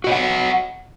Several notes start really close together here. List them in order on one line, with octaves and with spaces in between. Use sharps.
F#4 D#5 C#5 F#5